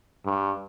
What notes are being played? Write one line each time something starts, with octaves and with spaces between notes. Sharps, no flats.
G2